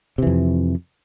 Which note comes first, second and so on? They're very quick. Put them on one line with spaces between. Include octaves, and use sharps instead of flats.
C3 E3 F2